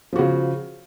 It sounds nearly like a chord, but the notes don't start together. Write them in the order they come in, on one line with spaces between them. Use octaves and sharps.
F3 F#4 C#3